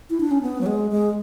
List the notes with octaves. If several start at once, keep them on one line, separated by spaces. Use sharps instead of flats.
E4
D4
C#4
B3
F#3
G#3
G#3